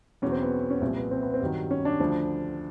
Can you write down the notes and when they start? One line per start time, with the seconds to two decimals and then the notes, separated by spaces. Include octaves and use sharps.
0.22 E2 B2 F#3 C#4
0.32 C4
0.42 B3
0.70 C#4
0.81 C2 A#2 F3 C4
0.96 B3
1.11 C4
1.22 B3
1.34 C4
1.41 G2 D#3 F#3
1.71 C#4
1.85 D4
2.00 D2 D3 F3